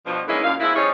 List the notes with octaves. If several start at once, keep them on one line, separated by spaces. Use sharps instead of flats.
G2 B2 F3
E3 G#3 A#3 C#4 D#4 E4
F#2 A#2 F5
B2 F3 G#3 E4
F3 G3 C#4 D#4 G#4 C#5